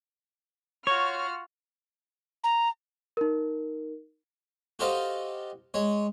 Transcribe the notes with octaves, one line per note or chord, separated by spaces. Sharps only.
F4 F#4 C#5 F6
A#5
D#4 A#4
F#4 G4 A4 C5 D#5 F5
G#3 C#5